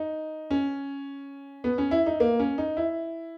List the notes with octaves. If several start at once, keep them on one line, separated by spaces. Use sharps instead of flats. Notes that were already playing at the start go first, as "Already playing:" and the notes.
Already playing: D#4
C#4
B3
C#4
E4
D#4
A#3
C#4
D#4
E4